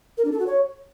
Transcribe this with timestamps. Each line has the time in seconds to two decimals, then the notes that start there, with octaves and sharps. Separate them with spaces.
0.17 A#4
0.25 D4
0.32 A4
0.39 F#4
0.47 C#5